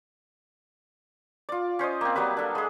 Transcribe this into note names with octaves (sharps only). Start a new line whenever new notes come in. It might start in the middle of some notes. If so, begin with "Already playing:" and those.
F4 D5
C#4 C5 D5 D#5
A#3 C4
F#3 G3 A#3 B4
D4 A4
G#3 G#4